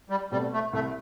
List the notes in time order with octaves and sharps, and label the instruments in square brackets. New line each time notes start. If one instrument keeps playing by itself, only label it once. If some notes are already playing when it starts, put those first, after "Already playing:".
[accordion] G3
[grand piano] B2 A3 C4 [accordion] G3
[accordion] A3
[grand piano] C2 [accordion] A3